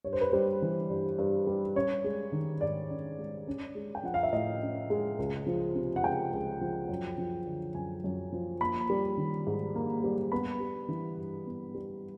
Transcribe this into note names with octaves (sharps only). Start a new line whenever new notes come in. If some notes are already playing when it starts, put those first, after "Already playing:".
G2 C#5
C5
B4
G3 C5
E3
G2
G2
G3
C#4 C#5
G#3
D#3
G#2 D5
C#4
G#3
C#4
G#3
G5
F3 F#5
F5
E5
A2 D#5
C#4
G#3
C#2
F3
C3
F#5
C#2 G5
C#2
F3
F#2
F3
D3
F#2 G#5
F#2
F3
A#3 B5
G3
D#3
G#2
A#3
G3
B3 B5
G3
E3
G2
B3
G3